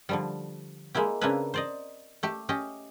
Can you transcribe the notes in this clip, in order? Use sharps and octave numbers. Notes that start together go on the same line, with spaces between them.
D3 F3 G3
G#3 A#3 E4 G4
C#3 A#3 C4 D4 E4 B4
C5 D5 D#5
A3 G4
C#4 G4 D#5